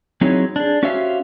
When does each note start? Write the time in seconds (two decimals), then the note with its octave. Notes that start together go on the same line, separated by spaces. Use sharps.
0.21 F#3 C4 D#4 E4 G#4 C#5
0.56 D4 G#4
0.83 C#4 F#4 G4 C5 E5 F5